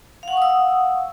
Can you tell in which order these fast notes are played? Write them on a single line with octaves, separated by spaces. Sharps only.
F5 F#5 C#6 D#6 E6